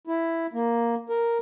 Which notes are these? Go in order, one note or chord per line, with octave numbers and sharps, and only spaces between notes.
E4
A#3
A#4